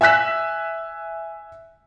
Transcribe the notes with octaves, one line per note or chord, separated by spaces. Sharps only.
E5 G#5 E6 F#6 B6 E7